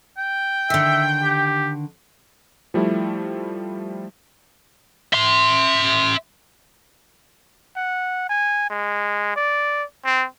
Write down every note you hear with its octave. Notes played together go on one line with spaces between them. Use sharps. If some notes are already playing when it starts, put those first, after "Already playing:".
G5
D3 D#3 E5
G4
F3 G3 A3 E4
E5 C6
F#5
G#5
G#3
D5
C4